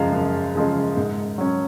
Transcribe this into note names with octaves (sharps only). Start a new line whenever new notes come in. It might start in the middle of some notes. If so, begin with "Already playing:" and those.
Already playing: F#2 C#3 F3 G#3 F5
F#2
C#3 F3 G#3
G#2
F#3 C#4